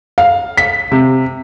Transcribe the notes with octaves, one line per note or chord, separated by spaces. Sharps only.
F5
B6
C3